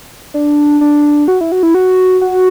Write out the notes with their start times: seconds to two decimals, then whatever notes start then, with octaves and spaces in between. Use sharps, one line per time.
0.34 D4
0.81 D4
1.28 F#4
1.41 E4
1.52 F#4
1.63 E4
1.74 F#4
2.21 F#4